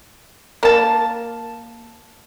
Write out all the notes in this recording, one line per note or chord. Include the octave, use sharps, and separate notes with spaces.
A#3 A5